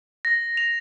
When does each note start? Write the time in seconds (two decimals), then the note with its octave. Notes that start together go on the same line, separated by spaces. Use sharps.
0.25 A#6
0.57 F7